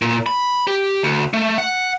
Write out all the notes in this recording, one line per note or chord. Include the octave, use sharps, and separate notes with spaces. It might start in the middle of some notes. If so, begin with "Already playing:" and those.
A#2
B5
G4
D2
A3
F#5